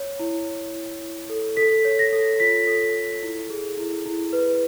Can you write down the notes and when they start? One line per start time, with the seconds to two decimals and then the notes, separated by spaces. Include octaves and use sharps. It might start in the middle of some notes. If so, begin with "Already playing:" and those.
Already playing: C#5
0.20 E4
0.47 C#5
0.75 E4
1.02 E4
1.30 A4
1.57 A4 B6
1.85 C#5
1.99 A#6
2.13 A4
2.40 F4 B6
2.67 A4
2.95 A4
3.23 E4
3.50 G#4
3.78 E4
4.06 E4
4.33 B4